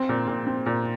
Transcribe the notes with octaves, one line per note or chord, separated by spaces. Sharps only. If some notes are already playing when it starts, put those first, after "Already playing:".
Already playing: C4
A#2
A#2
C4
A#2